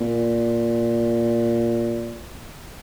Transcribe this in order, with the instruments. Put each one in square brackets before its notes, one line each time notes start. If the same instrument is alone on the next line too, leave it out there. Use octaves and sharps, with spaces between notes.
[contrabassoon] A#2